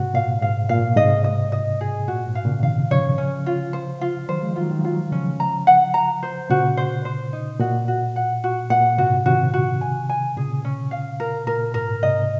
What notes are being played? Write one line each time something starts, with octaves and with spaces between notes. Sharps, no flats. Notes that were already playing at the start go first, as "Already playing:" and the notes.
Already playing: G#2 C3 F#4
A#2 F5
G#2 F5
A#2 F5
G#2 C3 D#5
D#5
D#5
G#4
A#2 F#4
G#2
F5
A#2 C#3
C3 D#3 F5
C#3 F3 C#5
C#4
F4
C5
F4
D#3 F#3 C5
F3 G#3
D#3 F#3 F4
D#3 F#3
D#3 F#3 F4
C#3 F3 C#4
A#5
F#5
A#5
C5
A#2 C#3 F#4
C5
C5
D#4
A#2 F#4
F#4
F#5
F#4
A#2 F#5
G#2 C3 F#4
C3 D#3 F#4
F#4
G#5
G#5
A#2 C#3 G#4
C#4
F5
A#4
A#2 A#4
G#2 A#4
G#2 C3 D#5